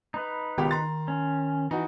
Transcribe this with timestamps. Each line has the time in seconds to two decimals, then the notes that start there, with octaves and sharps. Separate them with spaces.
0.14 D#4 B4
0.58 C#2 B2 D#3 G4
0.71 A#5 C6 A6
1.08 C#4
1.71 E3 D#4 F#4